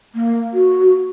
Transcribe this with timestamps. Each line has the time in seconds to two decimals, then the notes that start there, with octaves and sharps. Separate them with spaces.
0.15 A#3
0.53 F#4